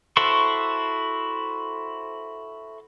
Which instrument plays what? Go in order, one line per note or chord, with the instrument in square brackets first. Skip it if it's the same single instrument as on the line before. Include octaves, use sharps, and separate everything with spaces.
[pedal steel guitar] E4 F#4 A4 C5 C#6